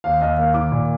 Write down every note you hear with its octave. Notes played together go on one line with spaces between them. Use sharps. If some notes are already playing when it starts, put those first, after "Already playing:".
D#2 F5
D#2 D#5
A#3 F5
D#3 D6
A#2